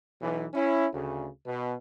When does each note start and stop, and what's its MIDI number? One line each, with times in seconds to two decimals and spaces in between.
0.21 0.46 35
0.21 0.46 52
0.54 0.86 61
0.54 0.86 64
0.93 1.28 38
0.93 1.28 49
1.46 1.75 47